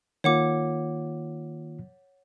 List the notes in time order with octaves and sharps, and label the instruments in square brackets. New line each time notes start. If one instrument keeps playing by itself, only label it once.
[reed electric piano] D#3 A#3 F4 [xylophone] C#5 F#5 D6